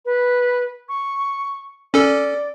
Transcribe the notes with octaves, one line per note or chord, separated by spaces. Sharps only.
B4
C#6
C#4 A4 D5